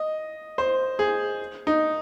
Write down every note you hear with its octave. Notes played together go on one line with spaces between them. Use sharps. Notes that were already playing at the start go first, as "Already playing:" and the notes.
Already playing: D#5
C5
G#4
D#4